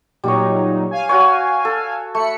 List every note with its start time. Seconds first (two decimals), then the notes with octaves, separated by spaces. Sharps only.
0.24 A#2 F#3 G3 D#4 C#5
0.91 F5 G#5
1.09 F#4 C#5
1.65 A4
2.15 A3 B5 C#7